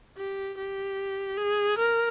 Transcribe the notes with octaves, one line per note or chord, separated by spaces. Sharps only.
G4
G4
G#4
A#4